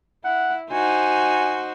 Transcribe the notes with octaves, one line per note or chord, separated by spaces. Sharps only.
E4 F#5
D#4 F#4 C5 G#5